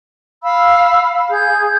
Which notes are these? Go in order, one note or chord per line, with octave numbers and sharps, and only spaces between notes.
F5 B5 E6
G#4 G6